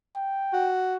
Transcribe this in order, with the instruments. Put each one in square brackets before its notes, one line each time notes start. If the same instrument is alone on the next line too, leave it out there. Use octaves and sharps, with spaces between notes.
[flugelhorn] G5
[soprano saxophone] F#4